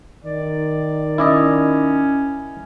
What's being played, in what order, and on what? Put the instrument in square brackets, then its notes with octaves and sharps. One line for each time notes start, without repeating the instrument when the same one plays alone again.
[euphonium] D#3 [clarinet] D5
[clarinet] C#4 [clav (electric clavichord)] E4 D5 D#5